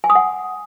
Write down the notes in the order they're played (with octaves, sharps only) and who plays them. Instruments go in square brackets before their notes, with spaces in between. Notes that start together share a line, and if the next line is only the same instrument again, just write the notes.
[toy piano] G#5
D#6
F#5